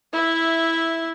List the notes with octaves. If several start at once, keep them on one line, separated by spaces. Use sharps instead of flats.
E4 E5